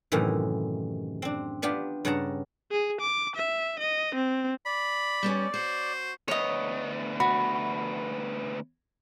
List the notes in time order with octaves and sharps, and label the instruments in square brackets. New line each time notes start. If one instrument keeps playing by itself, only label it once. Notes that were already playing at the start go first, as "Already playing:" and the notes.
[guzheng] F#2 A2 C3 D#3 E3
C4 D4
B3 D4 F4 G4
G2 C#3 F#5 A5 A#5
[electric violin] G#4
D6
E5
D#5
C4
[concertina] D5 [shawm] B5
[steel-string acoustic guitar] G3 B3 C#4
[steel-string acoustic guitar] F#4 [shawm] C5
[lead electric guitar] D2 B3 [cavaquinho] C#5 D#5
[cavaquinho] F#4 [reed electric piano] B5